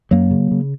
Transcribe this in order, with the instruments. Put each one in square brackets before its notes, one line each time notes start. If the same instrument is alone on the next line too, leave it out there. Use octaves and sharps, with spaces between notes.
[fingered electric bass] F#2 F#3 A#3
C#3
C#3